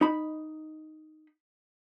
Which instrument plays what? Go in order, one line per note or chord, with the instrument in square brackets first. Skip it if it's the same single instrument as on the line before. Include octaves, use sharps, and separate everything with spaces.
[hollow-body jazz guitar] D#4 B5